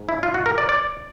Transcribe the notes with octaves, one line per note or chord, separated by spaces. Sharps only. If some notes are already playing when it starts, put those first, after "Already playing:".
Already playing: G#2
E4
F4
F#4
A#4
D5
D5